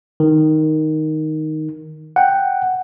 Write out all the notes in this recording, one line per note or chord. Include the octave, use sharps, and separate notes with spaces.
D#3
F#5 G5